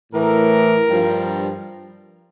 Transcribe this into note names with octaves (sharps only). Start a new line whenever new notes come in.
A2 E3 A#4
G2 F3